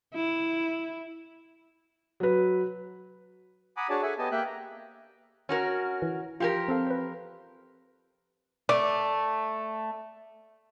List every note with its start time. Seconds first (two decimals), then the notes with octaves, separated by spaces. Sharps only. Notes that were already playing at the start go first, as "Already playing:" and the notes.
0.14 E4
2.20 F#3 B4
3.77 F#5 G#5 A#5 B5 D6 D#6
3.90 D4 F#4 G#4 C#5 D5 A5
4.02 G#4 A4 E5 F#5 G#5
4.18 B3 G4 D#5 G#5 A5
4.32 A#3 G4 E5 G5 F#6
4.47 A#5
5.49 C#4 F#4 A#4
6.02 E3
6.40 F3 F4 G4 A#4
6.68 C4 A4 F5
6.87 B4 C5
8.69 A3 D5